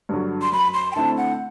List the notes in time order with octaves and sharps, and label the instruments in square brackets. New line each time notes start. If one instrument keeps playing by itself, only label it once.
[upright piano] G2 D3 F#3
[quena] C6
[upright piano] F#2 [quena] B5
[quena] C6
G5
[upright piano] D3 A3 C4 E4 [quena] A5
[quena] F#5